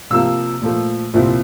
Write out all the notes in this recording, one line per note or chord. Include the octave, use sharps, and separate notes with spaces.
C3 F3 A#3 E6
A#2 F3 A3
C2 A#2 F3 C4 E4